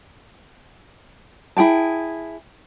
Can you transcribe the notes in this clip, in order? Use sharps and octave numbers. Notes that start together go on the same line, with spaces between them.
E4 G#4 G5 A5